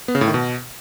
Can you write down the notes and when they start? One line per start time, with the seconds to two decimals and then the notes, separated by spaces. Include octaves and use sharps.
0.08 B3
0.15 C#3
0.21 A2
0.28 D#3
0.34 B2